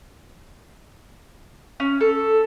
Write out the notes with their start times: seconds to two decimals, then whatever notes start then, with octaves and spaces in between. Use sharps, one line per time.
1.80 C#4
2.01 A4